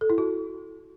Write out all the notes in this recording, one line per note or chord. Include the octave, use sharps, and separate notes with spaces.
A4
E4
F#4